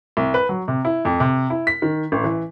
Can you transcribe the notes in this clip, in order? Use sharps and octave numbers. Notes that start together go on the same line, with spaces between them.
C2
B4
F#3
C3
E4
F2
C3
E4
B6
D#3
A1
E3